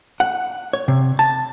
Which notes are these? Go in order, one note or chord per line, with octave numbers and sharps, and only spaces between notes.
F#5
C#5
C3
A5